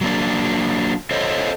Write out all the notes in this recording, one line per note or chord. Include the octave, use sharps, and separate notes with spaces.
F#3 A#3 D4
A4 C5 C#5 D#5